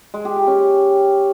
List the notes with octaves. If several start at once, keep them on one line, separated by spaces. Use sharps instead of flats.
G#3
G4
G4
C#4